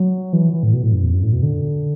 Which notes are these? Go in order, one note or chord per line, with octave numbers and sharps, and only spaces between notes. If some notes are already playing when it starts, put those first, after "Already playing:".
Already playing: F#3
E3
E3
A2
B2
A2
F#2
E2
F#2
A2
B2
D3